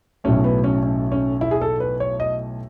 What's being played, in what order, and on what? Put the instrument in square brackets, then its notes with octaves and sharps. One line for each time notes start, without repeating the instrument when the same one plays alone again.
[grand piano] B1 A2 F#3 A3 C#4
B3
C#4
C#4
C#4
E4
G#4
A4
B4
C#5
D#5